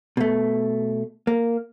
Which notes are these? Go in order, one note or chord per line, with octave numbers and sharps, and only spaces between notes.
B2 A3
A#3